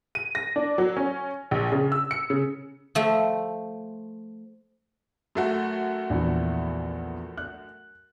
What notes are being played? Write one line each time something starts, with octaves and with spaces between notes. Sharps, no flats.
D#7
A#6
D4
F#3
C#4
A#1
C#3
E6
C#7
C#3
F3 A3
F#2 A3 F#4
A#1 E2 E3
F#6